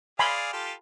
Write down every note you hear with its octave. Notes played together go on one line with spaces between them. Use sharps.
G#4 D5 F5 G#5 B5 C6
F4 G4 A4